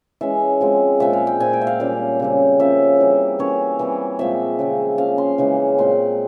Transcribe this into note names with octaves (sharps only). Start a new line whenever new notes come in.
E3 G#3 C#4 E5
F3 G#3 C4
A#2 F3 G#3 C4 E5
F5
G5
A#2 F3 C4 G#5
G5
E5
F5
A#2 G3 C#4
C#3 G3 C4
F3 A#3 C#4 E5
E3 G3 C4
E3 A#3 C#4 C#5
E3 G3 C4
A#2 F3 G#3 C4 E5
C#3 F3 C4
F3 A#3 C#4 F5
C6
C#3 E3 G#3 C#4
A#2 G#3 C4 C6